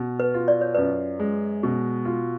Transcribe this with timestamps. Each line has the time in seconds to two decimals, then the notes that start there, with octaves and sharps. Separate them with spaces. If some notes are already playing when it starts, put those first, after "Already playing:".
Already playing: B2
0.20 B4
0.34 F4
0.48 D5
0.61 C#5
0.74 F#2 B4 D5
1.19 G#3
1.63 B2
2.05 F4